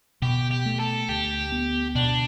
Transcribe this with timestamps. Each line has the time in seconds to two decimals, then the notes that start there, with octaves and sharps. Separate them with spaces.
0.22 B2 G4
0.51 G4
0.66 A3
0.80 A4
1.08 D2 G4
1.52 B3
1.95 B2 D4